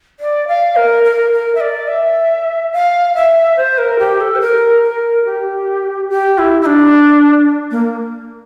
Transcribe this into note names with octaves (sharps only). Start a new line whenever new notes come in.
D5
F5
A#4
A#4
A#4
E5
D5
E5
F5
E5
C5
A#4
G4
A4
C5
A#4
A#4
G4
G4
E4
E4
D4
A#3